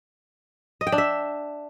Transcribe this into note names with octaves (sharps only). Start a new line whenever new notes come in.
D#5
G5
D4
E5